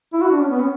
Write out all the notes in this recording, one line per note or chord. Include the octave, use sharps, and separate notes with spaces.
E4
F#4
D4
C#4
B3
C#4